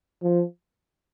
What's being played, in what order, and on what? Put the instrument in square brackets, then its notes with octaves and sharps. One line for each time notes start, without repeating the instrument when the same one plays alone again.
[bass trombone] F3